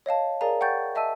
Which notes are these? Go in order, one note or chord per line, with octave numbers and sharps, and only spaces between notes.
C#5 D#5 F5 A5
G#4 A#4 D5 F5 G#5 A#5
F#5 G5 C#6 G6 A6
D#5 E5 A5 E6 D#7